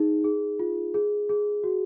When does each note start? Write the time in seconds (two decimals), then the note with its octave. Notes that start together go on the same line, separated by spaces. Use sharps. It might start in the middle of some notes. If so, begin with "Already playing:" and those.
Already playing: D#4 G#4
0.24 G#4
0.59 F4
0.94 G#4
1.29 G#4
1.64 F#4